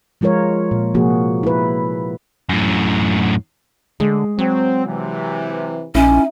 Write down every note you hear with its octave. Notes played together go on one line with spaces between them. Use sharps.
F3 G#3 F4 A#4 C#5
A#2
C3 F3 A#3 F#4 G#4
E4 B4
F#2 A2
D3 G#3
F#3 C4
C3 E3
A#1 C#4 D#4 E4